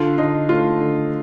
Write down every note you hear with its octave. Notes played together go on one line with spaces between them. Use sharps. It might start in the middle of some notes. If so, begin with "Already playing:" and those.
Already playing: D3 F4
D3 D#4
A3 F4
D3